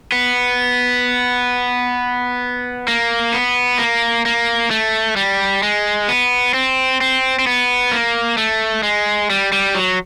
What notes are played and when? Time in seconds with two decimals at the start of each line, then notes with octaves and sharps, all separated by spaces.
0.12 B3
2.88 A#3
3.34 B3
3.79 A#3
4.26 A#3
4.71 A3
5.16 G3
5.63 G#3
6.09 B3
6.54 C4
7.01 C4
7.39 C4
7.47 B3
7.92 A#3
8.38 A3
8.83 G#3
9.30 G3
9.52 G3
9.75 F#3